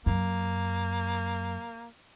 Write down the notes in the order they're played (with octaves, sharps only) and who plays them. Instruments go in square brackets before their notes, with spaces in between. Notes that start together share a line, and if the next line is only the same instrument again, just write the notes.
[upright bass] F#2 [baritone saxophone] A#3